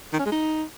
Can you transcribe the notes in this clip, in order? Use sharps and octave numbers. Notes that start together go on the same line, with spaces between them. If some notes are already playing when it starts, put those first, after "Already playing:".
D#3
C#4
G#3
D#4